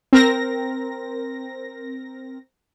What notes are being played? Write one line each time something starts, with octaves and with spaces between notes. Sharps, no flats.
C4 A#4 A#6